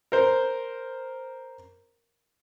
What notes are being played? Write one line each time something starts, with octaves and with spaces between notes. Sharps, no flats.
A#4 C5